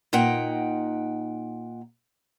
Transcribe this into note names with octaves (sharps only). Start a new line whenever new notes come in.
A#2 D#4 F#5 G5